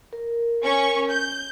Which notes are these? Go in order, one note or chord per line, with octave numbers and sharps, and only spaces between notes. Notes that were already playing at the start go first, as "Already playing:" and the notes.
A#4
C#4 C#6
G6